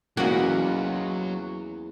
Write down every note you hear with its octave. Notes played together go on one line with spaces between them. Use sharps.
E2 F#3 A#3 C#4 F#4 B4 D#5